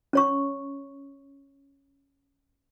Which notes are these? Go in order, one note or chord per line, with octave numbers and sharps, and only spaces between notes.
C#4 C#5 C#6